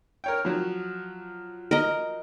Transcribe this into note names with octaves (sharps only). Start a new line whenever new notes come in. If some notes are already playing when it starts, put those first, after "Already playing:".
A#4 C#5 G5
F3 F#3
A#4 D#5